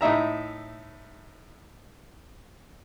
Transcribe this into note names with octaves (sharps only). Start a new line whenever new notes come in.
A2 D#4 E5 A#5